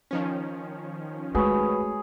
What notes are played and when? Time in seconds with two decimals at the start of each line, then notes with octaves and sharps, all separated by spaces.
0.11 D#3 F3 C#4
1.35 G#3 A3 F#4 G#4 B4 C#5 B5